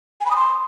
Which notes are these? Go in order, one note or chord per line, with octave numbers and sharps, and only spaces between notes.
G#5
B5
D#6
C6